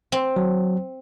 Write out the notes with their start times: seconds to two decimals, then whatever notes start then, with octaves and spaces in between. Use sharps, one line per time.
0.12 C4
0.36 F#3